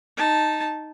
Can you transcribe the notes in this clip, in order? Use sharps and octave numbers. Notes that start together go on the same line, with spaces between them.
D#4 A5